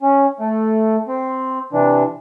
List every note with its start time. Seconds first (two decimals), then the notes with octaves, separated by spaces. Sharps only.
0.02 C#4
0.40 A3
1.08 C4
1.73 C3 E3 D4